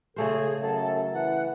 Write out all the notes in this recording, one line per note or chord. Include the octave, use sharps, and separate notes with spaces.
C#3 A3 G#4 A4 C5
F#2 A4
E3 F#5